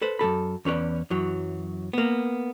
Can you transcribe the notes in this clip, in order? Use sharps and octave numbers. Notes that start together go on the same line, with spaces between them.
A4 B4 C5
F#2 B2 A4 B5
E2 C#4 B4 D5
F#2 E3 F#3
A#3 B3